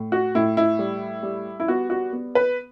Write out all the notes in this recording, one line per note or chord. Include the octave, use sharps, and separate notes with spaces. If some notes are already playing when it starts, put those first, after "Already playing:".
Already playing: A2
F#4
A2 E4
E4
G3
G3
E4
B3 F#4
F#4
B3
B4